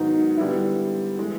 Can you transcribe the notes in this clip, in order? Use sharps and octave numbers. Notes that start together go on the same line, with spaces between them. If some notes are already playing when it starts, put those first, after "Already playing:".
Already playing: G#2 D#3 F#3 B3 D#4
D3 G3 B3 E4
E3 G#3